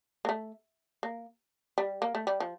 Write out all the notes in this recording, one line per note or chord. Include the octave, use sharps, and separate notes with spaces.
A#3
A3
A#3
G3
A#3
A3
G3
F3